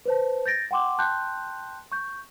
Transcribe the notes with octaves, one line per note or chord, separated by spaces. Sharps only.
B4 C5 A5
G6 A6 A#6 D7
F#5 G5 C6 D6
G5 A5 C6 F#6 G6
C#6 G6